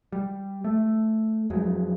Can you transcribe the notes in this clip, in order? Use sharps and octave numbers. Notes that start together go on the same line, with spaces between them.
G3
A3
F2 F#3 G#3